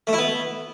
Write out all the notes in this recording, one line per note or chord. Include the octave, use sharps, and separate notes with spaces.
A3
E4
B3